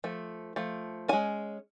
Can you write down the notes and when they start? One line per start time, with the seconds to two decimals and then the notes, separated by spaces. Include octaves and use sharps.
0.04 F3 A3
0.56 F3 A3
1.08 G#3 C#4 G#5